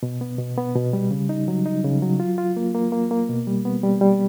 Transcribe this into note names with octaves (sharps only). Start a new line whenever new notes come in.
B2
B3
B2
B3
B2
G3
C#3
D#4
F#3
D#4
C#3
F#3
F4
F4
A#3
A#3
A#3
A#3
B2
G3
B3
G3
G3